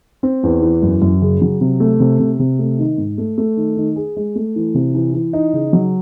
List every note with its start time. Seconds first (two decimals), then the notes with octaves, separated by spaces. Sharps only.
0.23 C4
0.43 E2
0.62 E3
0.82 F#2
1.02 F#2
1.22 C#3
1.42 F#3
1.61 C3
1.80 A3
2.00 C3
2.19 C3
2.39 C3
2.59 A3
2.79 D#3
2.98 G#2
3.18 A3
3.38 A3
3.57 D#3
3.77 D#3
3.96 G#4
4.17 G#3
4.35 A3
4.56 E3
4.75 C3
4.95 E3
5.14 E3
5.33 D#4
5.53 C#3
5.73 F#3